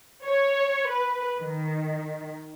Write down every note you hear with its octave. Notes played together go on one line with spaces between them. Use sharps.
C#5
B4
D#3